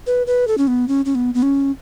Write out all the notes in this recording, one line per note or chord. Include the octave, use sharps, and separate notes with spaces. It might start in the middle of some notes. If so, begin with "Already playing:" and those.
B4
B4
A4
C#4
B3
C#4
C#4
B3
B3
C#4